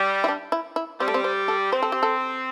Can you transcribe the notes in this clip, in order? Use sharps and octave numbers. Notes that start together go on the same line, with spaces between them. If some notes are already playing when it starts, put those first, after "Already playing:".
Already playing: G3
E4
D4
E4
E4
G3 C4
A3
C4
C5
A4
C4 C5
A4
G4
A4